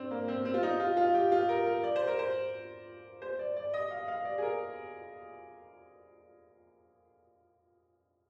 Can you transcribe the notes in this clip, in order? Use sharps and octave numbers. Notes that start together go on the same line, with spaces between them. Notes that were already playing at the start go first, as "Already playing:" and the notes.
Already playing: C4 D4
A#3
C4
C4
F4
D#4
F4
F4
G4
F4
A#4
A#4
D5
C5
A#4
C5
C5
D5
D5
D#5
F5
F5
D5
G#4
A#4